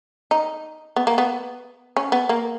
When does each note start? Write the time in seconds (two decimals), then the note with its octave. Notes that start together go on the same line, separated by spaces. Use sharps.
0.31 D#4
0.96 B3
1.07 A#3
1.18 B3
1.97 C#4
2.12 B3
2.29 A#3